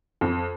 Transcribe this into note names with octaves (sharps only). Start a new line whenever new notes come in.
F2